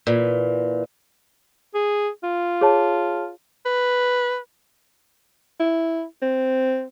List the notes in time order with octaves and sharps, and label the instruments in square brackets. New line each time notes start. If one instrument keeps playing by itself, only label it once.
[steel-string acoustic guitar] A#2 E3
[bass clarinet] G#4
F4
[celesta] G#4 C#5 A5
[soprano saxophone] B4
[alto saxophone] E4
C4